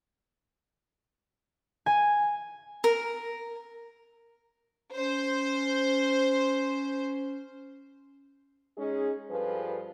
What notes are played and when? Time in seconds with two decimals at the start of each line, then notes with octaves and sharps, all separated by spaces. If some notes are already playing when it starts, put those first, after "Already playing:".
1.86 G#5
2.84 A#4
4.95 C#4 C5
8.77 G#3 C#4 D#4 G#4
9.30 G2 F3 G#4 A4 B4